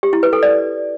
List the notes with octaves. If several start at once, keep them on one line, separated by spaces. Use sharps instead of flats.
G4
E4
B4
A4
D5